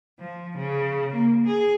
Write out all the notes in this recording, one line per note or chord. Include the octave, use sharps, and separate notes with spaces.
F3
C#3
A#3
G#4